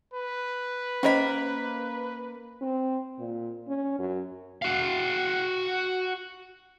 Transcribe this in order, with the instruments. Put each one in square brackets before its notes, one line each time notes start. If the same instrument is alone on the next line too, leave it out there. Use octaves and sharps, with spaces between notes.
[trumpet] B4
[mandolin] A#3 A#4 B5 [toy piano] C#4 C5 D#5
[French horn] C4
A#2
C#4
F#2
[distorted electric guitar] F#4 F5